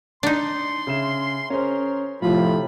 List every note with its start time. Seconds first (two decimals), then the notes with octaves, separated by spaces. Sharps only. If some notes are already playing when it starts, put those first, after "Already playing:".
0.23 D4 D#4 C6
0.87 C#3 E5 E7
1.50 C#4 G#4 A#4 C5
2.22 A2 C3 F3 F4 B5